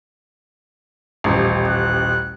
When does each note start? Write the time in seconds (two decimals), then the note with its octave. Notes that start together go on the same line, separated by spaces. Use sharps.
1.24 D#1 A1
1.68 F#6